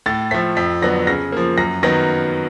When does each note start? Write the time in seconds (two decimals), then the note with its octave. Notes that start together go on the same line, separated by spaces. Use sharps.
0.06 A2 A6
0.31 F3 A3 B6
0.57 F2 B6
0.82 D3 F#3 B3 A#6
1.07 C#3 A#6
1.32 F3 A#3
1.58 F#2 A#6
1.83 D#3 F#3 B3 A#6